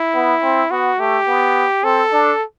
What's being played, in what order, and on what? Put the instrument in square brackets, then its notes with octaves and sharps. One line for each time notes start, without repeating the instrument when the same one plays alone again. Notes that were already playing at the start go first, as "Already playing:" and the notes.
Already playing: [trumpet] E4
[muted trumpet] B3
C4
[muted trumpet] B3 [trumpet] F#4
[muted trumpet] A3 [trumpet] G4
[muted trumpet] B3
[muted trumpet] C4 [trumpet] A4
[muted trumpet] D4